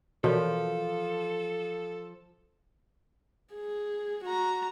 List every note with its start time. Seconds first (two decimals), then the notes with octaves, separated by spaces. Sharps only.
0.24 B2 E3 F3 A4 A#4 D5
3.54 G#4
4.24 F#4 A#5